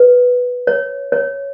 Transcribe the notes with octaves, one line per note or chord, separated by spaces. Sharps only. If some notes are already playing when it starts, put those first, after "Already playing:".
Already playing: B4
C#5
C#5